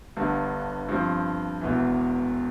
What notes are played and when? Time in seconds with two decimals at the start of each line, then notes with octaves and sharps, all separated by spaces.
0.17 G1 G2 D3
0.89 G2 F3 C4
1.61 E1 E2 E3